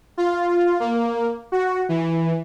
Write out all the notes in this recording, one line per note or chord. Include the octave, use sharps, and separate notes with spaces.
F4
A#3
F#4
E3